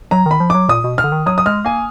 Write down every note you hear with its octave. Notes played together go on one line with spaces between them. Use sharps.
F#3 A#5
D#3 B5
F3
F#3 D6
A#2 D#6
B2
F6
D3
D#3
F#3 D#6
D#6
G#3 F6
A#3 G#5